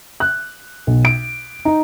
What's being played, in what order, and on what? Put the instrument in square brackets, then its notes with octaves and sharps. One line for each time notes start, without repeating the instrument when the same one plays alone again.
[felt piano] F#6
B1
D7
D#4